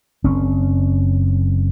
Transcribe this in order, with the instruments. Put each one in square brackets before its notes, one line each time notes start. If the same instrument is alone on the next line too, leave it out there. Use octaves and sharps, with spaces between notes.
[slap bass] F#1 C4 C#4